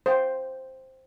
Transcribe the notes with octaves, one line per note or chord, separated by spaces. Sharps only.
C5 G5